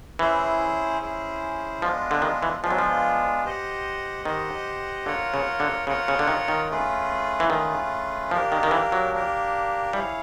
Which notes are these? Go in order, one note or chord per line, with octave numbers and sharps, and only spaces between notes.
E3 C#4 E4 G#4 C5
C#4 E4 G#4 C5
F3 G#3 B3 D4 F4
D3
D#3
E3
F3 G#3 B3 D4 F4
F#3
F3
G4 C5 D#5 F#5
D#3 G4 C5 D#5 F#5
D3 F4 A#4 C#5 F#5
C#3
D3
C#3 F4 A#4 C#5 F#5
C#3
D3
D#3
D#3
A3 C#4 F4 G#4 B4
E3
D#3 A3 C#4 F4 G#4 B4
F3 A#3 D4 G4 A#4
D#3
D#3
E3
F#3
A#3 D4 G4 A#4
G3 E4 G#4 C#5 F5